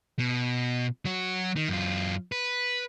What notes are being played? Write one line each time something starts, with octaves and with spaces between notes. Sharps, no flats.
B2
F#3 F#4
D#3
F#2 F4
B4